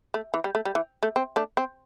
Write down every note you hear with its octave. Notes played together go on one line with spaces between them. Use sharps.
A3
E3
G3
A3
G3
E3
A3
C4
A3 D4
C4